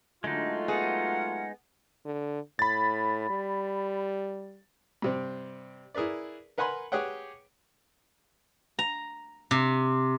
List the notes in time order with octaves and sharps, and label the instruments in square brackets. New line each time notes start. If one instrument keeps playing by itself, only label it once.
[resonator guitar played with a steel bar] D3 [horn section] F#3 A3 F4 [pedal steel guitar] G#3 D#4
[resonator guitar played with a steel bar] B3 G#4 [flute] F#5
[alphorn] D3
[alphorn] A2 [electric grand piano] B5 A6
[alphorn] G3
[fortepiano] G2 C3 C4
E4 G#4 A#4 B4 D5
A#4 B4 F#5 G#5 B5 C6
G4 G#4 B4 C#5 F#5 G5
[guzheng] A#5
C3